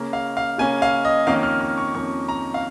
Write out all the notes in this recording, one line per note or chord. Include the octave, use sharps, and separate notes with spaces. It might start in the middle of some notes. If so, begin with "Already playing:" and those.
Already playing: C#3 A#3 C#4
F5
F5
C#3 A#3 C#4 G#5
F5
D#5
F2 D#3 A#3 C#4 F5
F6
F6
C#6
F2 D#3 A#3 C#4 C#6
A#5
F5